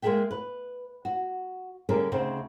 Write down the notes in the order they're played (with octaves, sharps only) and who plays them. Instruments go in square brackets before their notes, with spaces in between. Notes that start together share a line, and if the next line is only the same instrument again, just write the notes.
[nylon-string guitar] G#3 A#3 B3 G#4 E5 G5
B4
F#4
D3 G3 A#3 C#4 G#4 A#4
D2 C#3 C4 D#4 C5